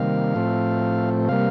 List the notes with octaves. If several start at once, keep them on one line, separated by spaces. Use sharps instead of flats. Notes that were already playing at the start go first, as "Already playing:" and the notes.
Already playing: C3 D#3 G3 A#3 F5
A2 F3 A3 C4
C3 G3 A#3 F5